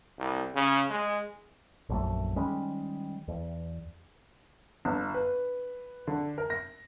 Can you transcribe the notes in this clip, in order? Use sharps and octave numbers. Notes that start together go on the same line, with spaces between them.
C2
C#3
G#3
A#1 F#2 A3
D#3 G3 G#3 C#4
E2
G1
B4
D3
A#4
A#6